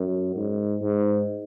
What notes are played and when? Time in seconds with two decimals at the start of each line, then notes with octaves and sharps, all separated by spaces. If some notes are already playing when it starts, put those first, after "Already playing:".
Already playing: F#2
0.36 G#2
0.81 G#2